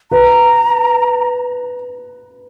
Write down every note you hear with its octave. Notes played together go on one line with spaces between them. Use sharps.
B4 A#5